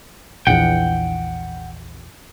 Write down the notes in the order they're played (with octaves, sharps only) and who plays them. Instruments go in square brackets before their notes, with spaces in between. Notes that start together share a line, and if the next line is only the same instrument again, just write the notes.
[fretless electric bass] A#1 E2 [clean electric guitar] F#5 G5